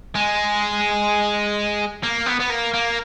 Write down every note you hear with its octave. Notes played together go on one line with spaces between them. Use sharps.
G#3
A#3
B3
B3
A#3
A#3